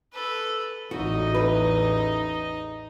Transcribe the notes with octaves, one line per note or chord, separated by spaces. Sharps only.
A4 B4
A1 E2 D#4 F#4 D#5
B4